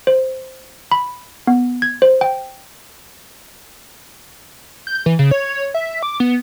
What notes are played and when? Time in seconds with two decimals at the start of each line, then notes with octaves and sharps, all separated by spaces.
0.07 C5
0.92 B5
1.47 B3
1.82 G#6
2.02 C5
2.21 G5
4.87 G6
5.06 E3
5.19 C#3
5.31 C#5
5.74 E5
6.03 D6
6.20 B3